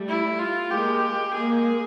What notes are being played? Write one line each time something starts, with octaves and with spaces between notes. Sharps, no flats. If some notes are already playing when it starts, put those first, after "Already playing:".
Already playing: G3 A3
E4
F4
G#3 A#3 G4
G#3 A#3 G#4